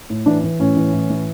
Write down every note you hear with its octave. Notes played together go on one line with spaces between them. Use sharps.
A2
E3 D4
E3
A2 C#4
E3
A2
E3